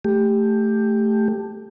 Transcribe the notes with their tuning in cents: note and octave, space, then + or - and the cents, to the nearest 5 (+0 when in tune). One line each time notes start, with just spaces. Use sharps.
A3 +0 G4 +10